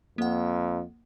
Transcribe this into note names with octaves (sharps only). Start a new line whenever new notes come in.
F2 A#3 F#5